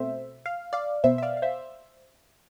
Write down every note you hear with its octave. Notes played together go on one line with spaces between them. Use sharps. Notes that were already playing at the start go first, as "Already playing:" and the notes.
Already playing: B2 A3 C4 C5 E5
F5
D5 F5
B2 B3 C5 E5
E5
D5 F5
F5
C5 E5